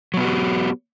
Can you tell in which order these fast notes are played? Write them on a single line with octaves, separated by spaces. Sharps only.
F#3 B3 F#4 G4